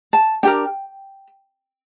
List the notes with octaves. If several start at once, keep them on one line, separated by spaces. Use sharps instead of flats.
A5
D4 G4 A#4 G5